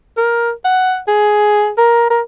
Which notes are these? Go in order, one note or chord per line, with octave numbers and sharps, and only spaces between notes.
A#4
F#5
G#4
A#4
A#4